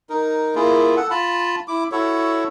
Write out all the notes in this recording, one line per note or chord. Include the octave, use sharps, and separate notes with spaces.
D#4 A#4
A#3 E4 F4 G#4
A4 F#5
F4 A5 B5
E4 D6
E4 F#4 A4 C#5